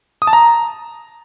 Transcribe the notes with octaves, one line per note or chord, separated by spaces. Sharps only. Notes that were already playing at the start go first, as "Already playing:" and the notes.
D#6
A5
A#5